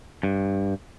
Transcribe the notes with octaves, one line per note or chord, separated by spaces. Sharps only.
G2